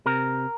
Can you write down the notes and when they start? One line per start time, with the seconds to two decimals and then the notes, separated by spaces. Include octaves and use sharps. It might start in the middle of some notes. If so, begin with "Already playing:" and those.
0.06 C3 A#4